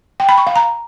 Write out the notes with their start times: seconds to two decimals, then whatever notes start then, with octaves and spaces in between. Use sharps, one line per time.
0.20 G5
0.29 B5
0.38 C#6
0.47 F5
0.56 A#5